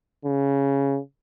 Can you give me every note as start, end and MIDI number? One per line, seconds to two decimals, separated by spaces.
0.25 0.99 49